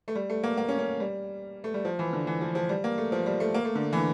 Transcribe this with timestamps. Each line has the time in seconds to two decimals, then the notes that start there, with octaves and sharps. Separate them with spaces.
0.08 A3
0.15 G3
0.29 A3
0.43 A#3
0.57 A#3
0.68 C#4
0.79 C#4
1.00 G3
1.64 A3
1.74 G3
1.85 F3
1.99 E3
2.13 D3
2.27 E3
2.41 F3
2.55 F3
2.69 G3
2.84 A#3
2.98 A3
3.12 F3
3.26 G3
3.40 A3
3.54 A#3
3.65 A3
3.75 D3
3.93 E3
3.97 D3